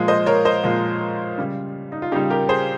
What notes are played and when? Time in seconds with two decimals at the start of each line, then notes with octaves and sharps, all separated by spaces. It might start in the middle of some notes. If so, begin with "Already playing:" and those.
Already playing: A#2 F3 G#3
0.08 C5 D#5
0.26 A#4 C#5
0.45 C5 D#5
0.64 A#2 F3 G#3
1.38 C#3 G3
1.92 D#4
2.02 F4
2.12 C#3 D#4 G4
2.16 G3
2.30 G4 A#4
2.49 G#4 C5